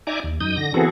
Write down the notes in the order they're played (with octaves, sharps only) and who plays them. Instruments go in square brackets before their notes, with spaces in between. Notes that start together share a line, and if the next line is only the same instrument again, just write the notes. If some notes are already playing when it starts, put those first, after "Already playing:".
[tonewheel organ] D#4 D5 E5 G#5 A#5 D6
D#2
F#2 D#4 D#6 G6
D3 A#6
E3 B3 C4 F#4 G#4 A4